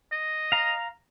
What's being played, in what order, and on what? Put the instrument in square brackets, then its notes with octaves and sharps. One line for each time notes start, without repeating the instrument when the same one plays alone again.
[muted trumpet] D#5
[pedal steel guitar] F5 A#5